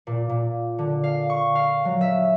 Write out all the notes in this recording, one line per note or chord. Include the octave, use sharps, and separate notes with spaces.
A#2
A#2
D3
F5
C#6
F5
F#3
E5